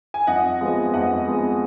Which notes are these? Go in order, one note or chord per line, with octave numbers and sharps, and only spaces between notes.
G#5
F2 D#5 F#5
F3 G#3 B3
F2 D#5 F#5
F3 G#3 B3